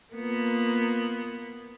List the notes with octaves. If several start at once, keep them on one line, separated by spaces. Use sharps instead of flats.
A#3 B3 F4